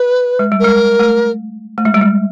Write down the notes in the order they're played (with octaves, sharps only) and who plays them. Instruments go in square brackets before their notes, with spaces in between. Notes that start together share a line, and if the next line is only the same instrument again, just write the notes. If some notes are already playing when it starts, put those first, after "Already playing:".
Already playing: [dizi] B4
[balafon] G#3
G3
[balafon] G#3 [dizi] A#4
[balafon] A3
A3
G#3
G3
G#3